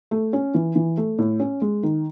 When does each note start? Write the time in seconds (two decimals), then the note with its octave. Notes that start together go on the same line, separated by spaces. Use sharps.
0.11 A3
0.33 C#4
0.54 E3
0.76 E3
0.97 A3
1.19 A2
1.40 C#4
1.62 G#3
1.83 D#3